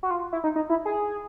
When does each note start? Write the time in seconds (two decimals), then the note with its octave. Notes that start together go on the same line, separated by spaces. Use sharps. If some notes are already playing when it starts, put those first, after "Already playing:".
0.03 F#4
0.11 F4
0.33 E4
0.44 D#4
0.56 D#4
0.70 E4
0.86 G#4